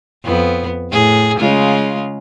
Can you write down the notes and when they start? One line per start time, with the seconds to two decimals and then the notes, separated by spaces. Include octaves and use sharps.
0.25 F2 B3
0.91 A2 G#4
1.38 C#3 G#3 F4